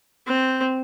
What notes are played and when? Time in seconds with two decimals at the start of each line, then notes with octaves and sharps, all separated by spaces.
0.27 C4